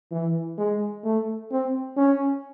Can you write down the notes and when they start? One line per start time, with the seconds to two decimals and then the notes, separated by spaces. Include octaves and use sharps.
0.12 E3
0.58 G#3
1.04 A3
1.51 C4
1.97 C#4